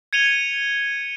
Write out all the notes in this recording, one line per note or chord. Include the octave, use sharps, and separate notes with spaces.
G#6 C#7 D#7 F7 G7